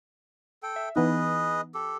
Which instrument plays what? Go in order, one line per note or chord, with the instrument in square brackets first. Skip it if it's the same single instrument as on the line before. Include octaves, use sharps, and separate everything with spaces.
[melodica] A4 G5
[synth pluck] E5
[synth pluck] E3 B3 D#4 [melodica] G#4 B4 D#5
[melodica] G4 A4